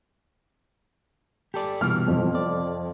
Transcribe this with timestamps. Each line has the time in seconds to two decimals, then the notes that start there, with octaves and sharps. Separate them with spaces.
1.54 G4 A4 D5
1.81 C2 B2 E3 F6
2.08 F2
2.35 D5